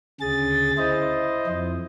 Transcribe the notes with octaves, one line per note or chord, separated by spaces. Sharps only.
D2 C#3 G#4 A6
E4 C5 D#5
F2